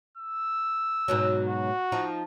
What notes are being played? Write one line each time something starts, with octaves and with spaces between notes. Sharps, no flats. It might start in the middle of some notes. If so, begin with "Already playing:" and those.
E6
G#2 B2 F#3
F#4
F3 D#4 F4